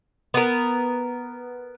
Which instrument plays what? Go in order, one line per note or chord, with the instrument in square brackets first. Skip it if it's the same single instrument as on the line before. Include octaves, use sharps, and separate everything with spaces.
[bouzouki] B3 A#4